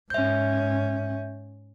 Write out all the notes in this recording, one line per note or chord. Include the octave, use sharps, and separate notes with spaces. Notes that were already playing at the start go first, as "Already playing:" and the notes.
G#2 C#4 E5 G6